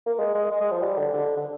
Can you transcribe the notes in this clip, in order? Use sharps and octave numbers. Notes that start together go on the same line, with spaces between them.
A#3
G#3
G#3
G#3
G#3
F3
G3
D3
D3
D3